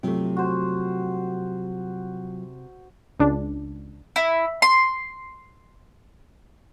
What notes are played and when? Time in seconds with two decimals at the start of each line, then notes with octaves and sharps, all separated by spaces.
0.03 C3 F#3 A3 F4
0.37 F#4 C5
3.20 C#2 D4
4.16 E4
4.62 C6